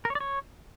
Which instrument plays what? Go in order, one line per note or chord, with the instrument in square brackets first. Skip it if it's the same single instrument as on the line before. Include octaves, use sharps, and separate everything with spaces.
[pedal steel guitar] A#4
C#5
D5
C#5